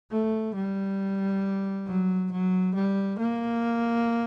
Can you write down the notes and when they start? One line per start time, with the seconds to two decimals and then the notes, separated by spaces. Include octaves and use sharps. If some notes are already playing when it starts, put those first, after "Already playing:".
0.11 A3
0.56 G3
1.87 F#3
2.32 F#3
2.75 G3
3.19 A#3